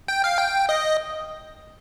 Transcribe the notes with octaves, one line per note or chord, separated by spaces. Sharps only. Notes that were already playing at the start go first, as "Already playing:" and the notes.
G5
F5
G5
D#5